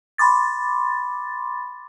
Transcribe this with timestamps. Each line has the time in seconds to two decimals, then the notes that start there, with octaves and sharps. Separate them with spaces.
0.18 B5 C6 D6 A6